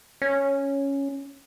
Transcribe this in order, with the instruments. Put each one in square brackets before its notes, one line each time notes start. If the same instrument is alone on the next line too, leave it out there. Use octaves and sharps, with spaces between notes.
[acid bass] C#4